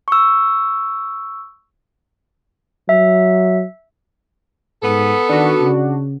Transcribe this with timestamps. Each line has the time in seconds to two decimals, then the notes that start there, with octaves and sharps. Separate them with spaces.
0.08 C#6 E6
2.89 F#3 E5
4.83 G#2 B3 A4
5.29 D#3 D4 F#4
5.61 C#3